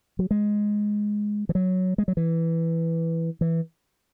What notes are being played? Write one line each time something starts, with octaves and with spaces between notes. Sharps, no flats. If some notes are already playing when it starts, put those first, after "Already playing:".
F#3
G#3
E3
F#3
G#3
F#3
E3
E3